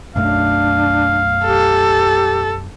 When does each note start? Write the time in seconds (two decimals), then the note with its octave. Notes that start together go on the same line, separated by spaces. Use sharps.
0.16 B1 F#2 A3 D4 F5
1.45 G4 A4